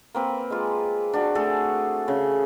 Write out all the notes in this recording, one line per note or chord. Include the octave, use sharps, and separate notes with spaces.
A#3 C4 B4
G#3 F4
D4 F#4 A5
A3 G#4 A4
C#3